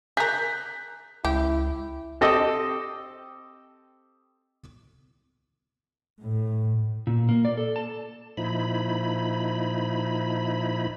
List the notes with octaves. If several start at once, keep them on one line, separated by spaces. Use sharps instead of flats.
G#4 A#4 F#6 G6 B6
C#2 E4 G4
C4 G4 A4 D#5
A2
A#2
A#3
D5
A4
A5
A#2 F3 D#4 E4 B5